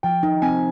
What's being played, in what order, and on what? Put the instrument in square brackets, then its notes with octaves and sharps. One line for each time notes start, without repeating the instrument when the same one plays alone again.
[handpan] F3 [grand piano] G5
[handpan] D#4
[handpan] C4 [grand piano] G#5